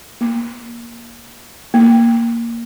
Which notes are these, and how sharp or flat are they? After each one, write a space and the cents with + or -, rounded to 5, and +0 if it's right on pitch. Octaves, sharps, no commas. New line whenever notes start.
A#3 +10
A#3 -5